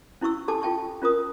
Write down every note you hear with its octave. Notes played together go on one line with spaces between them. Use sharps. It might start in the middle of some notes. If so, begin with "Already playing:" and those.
C#4 E4 F#4 C#6 E6
F#4 G4 A4 G#5 A5 D6
F4 G5 A5 C#6
C#4 F4 A#4 D#6